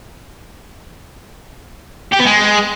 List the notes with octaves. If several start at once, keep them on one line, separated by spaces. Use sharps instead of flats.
G4
B3
G#3